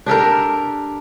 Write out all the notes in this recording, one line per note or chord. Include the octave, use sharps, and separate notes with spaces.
D4 G4 A4 A#4